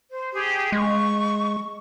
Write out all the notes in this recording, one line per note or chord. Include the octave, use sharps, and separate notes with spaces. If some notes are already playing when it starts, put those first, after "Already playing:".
C5
G4 G#4
G#3 C#6